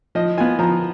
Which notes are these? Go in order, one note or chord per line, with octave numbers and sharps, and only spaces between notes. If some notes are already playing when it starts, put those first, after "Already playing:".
F3 D#5
B3 F4 G#5
F3 A#5